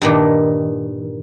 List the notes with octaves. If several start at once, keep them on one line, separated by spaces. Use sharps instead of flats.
G2 A#2 D#3